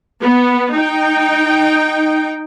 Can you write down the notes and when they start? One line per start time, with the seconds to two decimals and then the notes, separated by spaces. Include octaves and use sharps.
0.23 B3
0.73 D#4 G5